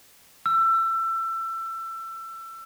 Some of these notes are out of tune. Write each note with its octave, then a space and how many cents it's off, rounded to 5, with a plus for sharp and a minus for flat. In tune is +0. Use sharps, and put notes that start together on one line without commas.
E6 +25